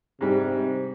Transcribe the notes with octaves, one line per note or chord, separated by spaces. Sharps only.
G#2 C3 G3